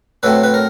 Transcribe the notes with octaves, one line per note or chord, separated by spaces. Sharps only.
A2 F#3 A3 C4 A4 B4
B4
A#4